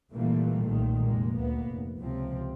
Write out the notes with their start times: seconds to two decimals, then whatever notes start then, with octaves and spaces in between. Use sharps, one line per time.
0.12 A#2 D3 E3 G3 A3 A#3
0.66 B1 A#2 D#3 A3
1.03 F1 G#3 A#3
1.38 D2 A#3 B3
1.67 F1
2.02 C#2 C3 F3 C4